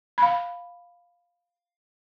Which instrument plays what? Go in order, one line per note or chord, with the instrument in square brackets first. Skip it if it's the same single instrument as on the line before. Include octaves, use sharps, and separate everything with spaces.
[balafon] F5 B5